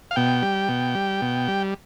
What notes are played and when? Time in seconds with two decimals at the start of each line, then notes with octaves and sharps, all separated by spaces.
0.11 F5
0.16 B2 G5
0.42 G3
0.69 B2
0.95 G3
1.22 B2
1.48 G3